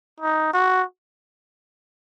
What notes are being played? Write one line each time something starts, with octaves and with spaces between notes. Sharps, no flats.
D#4
F#4